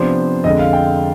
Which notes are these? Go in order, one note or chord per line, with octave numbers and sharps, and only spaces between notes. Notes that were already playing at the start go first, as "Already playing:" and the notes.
Already playing: C3 F3 B3 D4 C5
F2 D3 G#3 D#5
F5
G5